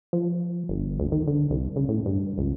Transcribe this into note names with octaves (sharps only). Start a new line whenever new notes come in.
F3
G1
D2
D#3
D3
C2
C#3
A2
G2
C#2